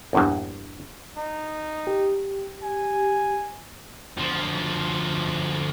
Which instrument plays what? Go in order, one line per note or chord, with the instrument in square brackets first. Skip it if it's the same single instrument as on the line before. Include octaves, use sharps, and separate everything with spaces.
[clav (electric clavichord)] A#1 E2 G2
[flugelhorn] D#4
[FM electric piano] G4
[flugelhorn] G#5
[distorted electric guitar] D2 F3